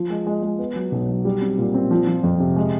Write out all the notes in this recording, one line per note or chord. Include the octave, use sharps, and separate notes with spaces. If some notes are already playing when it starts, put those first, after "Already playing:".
Already playing: F3
G#3
G#3
G#3
B3
F#3
B1
F#3
G3
C4
A#2
C4
F3
F3
F2
C3
G#3